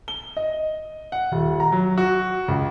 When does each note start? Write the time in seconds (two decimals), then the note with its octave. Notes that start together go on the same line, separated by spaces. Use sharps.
0.08 G7
0.37 D#5
1.12 F#5
1.32 D#1
1.60 A#5
1.72 F#3
1.98 F#4
2.48 C#2